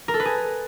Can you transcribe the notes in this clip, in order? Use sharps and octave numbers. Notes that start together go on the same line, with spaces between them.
A#4
A4
B4
G#4